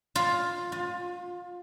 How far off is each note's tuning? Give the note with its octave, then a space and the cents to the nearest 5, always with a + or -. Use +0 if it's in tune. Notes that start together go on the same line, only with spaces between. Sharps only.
F4 +10
F4 +30